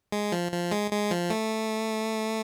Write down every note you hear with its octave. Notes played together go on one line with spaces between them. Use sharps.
G#3
F3
F3
G#3
G#3
F3
A3